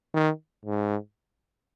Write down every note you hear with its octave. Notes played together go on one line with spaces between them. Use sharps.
D#3
G#2